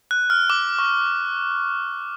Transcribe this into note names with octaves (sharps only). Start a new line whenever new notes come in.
F#6
F6
D6
C#6